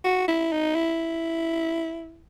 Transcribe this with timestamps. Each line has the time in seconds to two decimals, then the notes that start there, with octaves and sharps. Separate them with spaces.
0.04 F#4
0.28 E4
0.52 D#4
0.75 E4